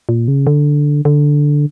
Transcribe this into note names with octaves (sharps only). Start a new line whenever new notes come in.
A#2
C#3
D3
D3